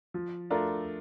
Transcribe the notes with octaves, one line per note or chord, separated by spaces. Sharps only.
F3
A3 D4 F4 A#4